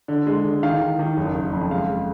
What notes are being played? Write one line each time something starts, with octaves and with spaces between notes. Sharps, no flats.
D3
G#3
D3
D#3 F5
D#3
D#3
F#1
F#1
F2
G#3 F5
G#3